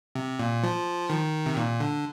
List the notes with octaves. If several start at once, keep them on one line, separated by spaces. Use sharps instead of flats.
C3
A#2
F3
D#3
C3
A#2
D3